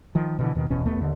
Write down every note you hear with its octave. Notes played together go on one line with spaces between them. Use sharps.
D#3 F3
B2 D3 E3
D#2 B2 D#3
F#1 E2 B2 C#4
D1 D#2 A3 B3
D#2 D3